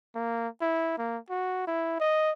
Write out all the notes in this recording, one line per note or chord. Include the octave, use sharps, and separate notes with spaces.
A#3
E4
A#3
F#4
E4
D#5